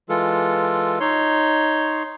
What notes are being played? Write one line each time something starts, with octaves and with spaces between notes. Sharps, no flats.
E3 G#3 F4 A4
D#4 C#5 C6